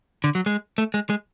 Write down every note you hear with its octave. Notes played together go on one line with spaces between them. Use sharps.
D3
F#3
G#3
A3
G#3
G#3